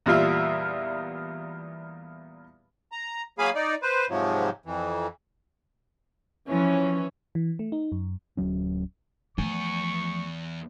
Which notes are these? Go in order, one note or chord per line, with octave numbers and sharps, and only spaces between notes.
E2 A#2 G3 F4 E5
A#5
F#3 A#3 G#4 F5 G#5 B5
D#4 D5
B4 C5
G#2 C3 F3 F#3
F2 E3
E3 F3 C#4
E3
A3
D#4
F#2
D1 F#3 C#4
E2 F3 A3 G#5 C#6